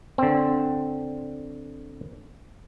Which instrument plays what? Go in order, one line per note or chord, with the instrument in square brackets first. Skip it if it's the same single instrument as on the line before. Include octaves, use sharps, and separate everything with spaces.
[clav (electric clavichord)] D3 C4